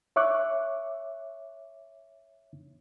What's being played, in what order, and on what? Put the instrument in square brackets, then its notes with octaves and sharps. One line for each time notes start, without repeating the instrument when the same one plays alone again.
[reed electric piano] C#5 E5 C#6 D6 F#6